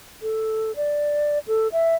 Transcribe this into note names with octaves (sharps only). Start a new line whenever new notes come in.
A4
D5
A4
E5